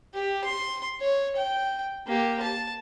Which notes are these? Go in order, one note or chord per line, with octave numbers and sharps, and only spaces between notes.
G4
C6
C#5
G5
A#3 G4
A5